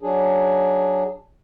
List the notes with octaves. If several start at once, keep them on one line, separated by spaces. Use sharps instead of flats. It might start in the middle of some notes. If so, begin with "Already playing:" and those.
F#3 D4 G#4